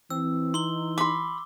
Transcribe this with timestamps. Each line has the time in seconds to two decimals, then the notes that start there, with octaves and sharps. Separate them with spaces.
0.10 E3 C4 E6
0.54 D#4 C6 G7
0.98 B5 C6 D6